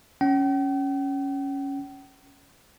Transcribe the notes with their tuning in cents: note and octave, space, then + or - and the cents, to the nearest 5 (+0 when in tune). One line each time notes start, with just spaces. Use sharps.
C#4 +0 G5 -45